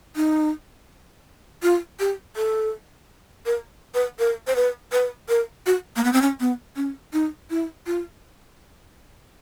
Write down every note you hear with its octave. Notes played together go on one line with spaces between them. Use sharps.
D#4
F4
G4
A4
A#4
B4
A#4
C5
B4
B4
A#4
F#4
A#3
B3
C4
C#4
B3
C#4
D#4
E4
F4